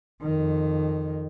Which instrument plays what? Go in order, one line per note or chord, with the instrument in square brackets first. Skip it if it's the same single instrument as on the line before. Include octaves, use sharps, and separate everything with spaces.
[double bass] F2 D#3